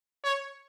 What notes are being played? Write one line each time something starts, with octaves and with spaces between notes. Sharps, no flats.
C#5